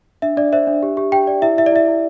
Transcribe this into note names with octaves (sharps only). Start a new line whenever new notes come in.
D4 E5
D4 D5
C5 E5
D4
G4
G4
G4 G5
D5
E4 E5
E4 E5
D5
E4 E5
E4